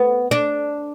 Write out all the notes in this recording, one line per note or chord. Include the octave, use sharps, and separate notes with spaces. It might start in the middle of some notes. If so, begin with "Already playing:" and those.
Already playing: B3
D4